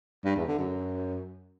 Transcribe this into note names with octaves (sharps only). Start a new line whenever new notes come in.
G2
E2
D3
F#2